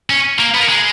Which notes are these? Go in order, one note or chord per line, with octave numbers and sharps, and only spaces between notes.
C#4
A#3
B3
A#3
G#3